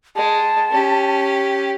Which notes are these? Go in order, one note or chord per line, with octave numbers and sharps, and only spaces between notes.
G#3 G5 A5
C#4 G4